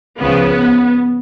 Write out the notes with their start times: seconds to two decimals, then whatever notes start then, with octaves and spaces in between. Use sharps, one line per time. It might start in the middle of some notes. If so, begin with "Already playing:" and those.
0.19 C#2 C#3 F3 B3